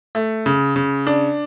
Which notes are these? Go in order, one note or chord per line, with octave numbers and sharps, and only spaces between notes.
A3
C#3
C#3
D4